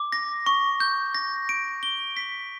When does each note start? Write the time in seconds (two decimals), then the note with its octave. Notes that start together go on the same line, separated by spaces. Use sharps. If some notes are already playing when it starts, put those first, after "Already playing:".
Already playing: D6
0.12 A#6
0.46 C#6
0.80 G6
1.15 A#6
1.49 D7
1.83 G7
2.17 B6